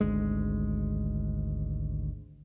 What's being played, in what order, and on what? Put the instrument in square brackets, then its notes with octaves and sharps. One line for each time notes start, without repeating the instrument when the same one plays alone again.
[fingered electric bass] G#1 D2 G#3